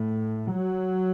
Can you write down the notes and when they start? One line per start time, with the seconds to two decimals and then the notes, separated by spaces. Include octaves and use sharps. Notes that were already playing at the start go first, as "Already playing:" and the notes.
Already playing: A2
0.52 F#3